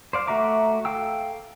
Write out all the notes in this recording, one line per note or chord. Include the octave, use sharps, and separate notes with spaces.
C5 D5 F5
A3 F#4 E5 A#5 D6
A4 F5 G5 E6